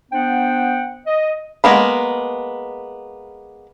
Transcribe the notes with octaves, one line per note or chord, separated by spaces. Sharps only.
B3 D4 C5 F#5 G5
D#5
G#3 A#3 B3 B5